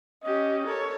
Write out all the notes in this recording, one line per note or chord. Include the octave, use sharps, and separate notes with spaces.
C#4 G4 D#5
A4 A#4 C#5